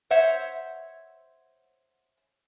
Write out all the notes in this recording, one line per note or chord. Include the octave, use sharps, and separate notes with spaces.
C5 C#5 E5 F#5